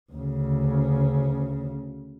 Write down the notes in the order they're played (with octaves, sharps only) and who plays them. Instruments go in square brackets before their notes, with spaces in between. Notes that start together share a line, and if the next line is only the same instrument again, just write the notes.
[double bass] D2 C#3